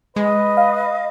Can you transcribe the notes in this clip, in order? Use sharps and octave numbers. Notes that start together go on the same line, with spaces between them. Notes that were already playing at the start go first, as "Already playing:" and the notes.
G#3 B4 D#5
F5